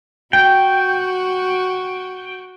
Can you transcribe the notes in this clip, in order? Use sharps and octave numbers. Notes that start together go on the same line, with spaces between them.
F#4 G5